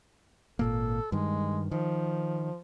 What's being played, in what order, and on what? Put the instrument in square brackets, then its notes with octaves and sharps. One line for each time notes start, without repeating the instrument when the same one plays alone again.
[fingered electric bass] G#1 A#2 A#3 [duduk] A4
[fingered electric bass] G2 D#3 [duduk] G#3
[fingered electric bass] D#3 [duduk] F3